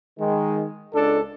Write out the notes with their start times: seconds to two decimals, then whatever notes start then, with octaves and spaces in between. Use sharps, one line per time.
0.20 D#3 G#3
0.94 C#2 D4 A4